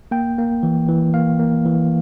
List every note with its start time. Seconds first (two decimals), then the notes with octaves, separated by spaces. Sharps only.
0.11 A#3 G5
0.38 A#3
0.63 E3
0.88 E3
1.14 A#3 F5
1.39 A#3
1.66 E3